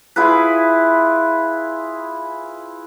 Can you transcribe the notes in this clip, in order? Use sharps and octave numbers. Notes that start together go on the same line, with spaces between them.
E4 F4 G#4 B4